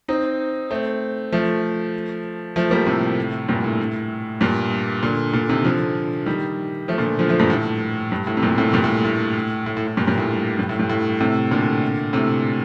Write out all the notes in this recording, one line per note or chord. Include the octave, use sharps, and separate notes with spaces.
C4 D#4
A3 C4
F3 A3
F3 A3
G3 A#3
A2 C3
G2 A#2
A2
G2 A#2
A#2 D3
A#2 D3
C3 D#3
D3 F3
D#3 G3
F3 A3
A#2 D3
D3 F3
F3 A3
G2 A#2
A2
G2
A2
C3
G2 A#2
A2 C3
G2 A#2
A2
A2
A2
A2
A2
G2 A#2
G2 A#2
A2
G2
A2
G2
A2
A2 C3
A#2 D3
A2 C3